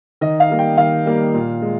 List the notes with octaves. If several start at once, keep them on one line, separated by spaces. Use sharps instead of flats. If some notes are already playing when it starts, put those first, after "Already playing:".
D#3 D#5
F5
G3 A#3
G5
D#3 F5
G3 A#3
A#2
G#3